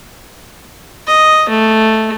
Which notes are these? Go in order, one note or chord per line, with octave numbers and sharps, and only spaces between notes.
D#5
A3